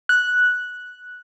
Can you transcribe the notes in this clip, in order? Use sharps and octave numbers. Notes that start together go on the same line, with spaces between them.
F#6